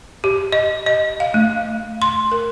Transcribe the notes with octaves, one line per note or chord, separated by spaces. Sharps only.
G4
D#5
D#5
F5
A3
C6
A#4